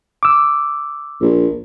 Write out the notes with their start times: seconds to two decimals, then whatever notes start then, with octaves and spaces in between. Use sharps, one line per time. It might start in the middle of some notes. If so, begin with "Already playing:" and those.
0.23 D6 E6
1.21 A#1